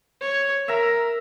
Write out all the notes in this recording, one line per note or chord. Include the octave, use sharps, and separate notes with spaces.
C#5
A#4 E5 A#5